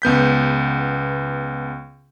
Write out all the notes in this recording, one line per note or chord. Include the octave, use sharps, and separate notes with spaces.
C#2 B3 G6 B6